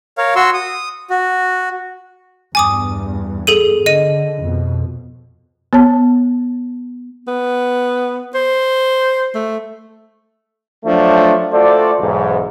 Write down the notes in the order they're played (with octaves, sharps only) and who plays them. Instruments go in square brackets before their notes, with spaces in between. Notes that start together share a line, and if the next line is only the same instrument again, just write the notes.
[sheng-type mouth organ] A#4 C#5 F5
F#4 C6 C#6 E6
D#6
F#4
[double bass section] E2 G2 [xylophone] G#5 D6 D#6
[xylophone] G#4 A4 D#7
[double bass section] D3 [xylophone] D#5 D#7
[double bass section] F2 B2
[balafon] B3 C#5 A5
[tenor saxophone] B3
C5
A3
[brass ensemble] F3 F#3 A3 D4
A3 F4 F#4 A4 C5 D5
B1 E2 G#2